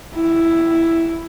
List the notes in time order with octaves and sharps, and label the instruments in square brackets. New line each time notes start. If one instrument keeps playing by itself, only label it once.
[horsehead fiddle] E4